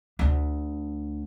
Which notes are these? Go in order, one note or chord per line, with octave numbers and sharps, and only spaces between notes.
D2 D4